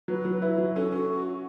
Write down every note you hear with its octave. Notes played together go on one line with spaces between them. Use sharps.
F#3 B4
F#3
E4
F#3
C#4 A4
C#4 F#4